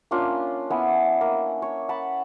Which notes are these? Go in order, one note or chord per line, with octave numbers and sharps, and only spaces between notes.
A#3 C#4 D4 F4
B3 E4 G#5
A#3
C#5
F#5 A5 B5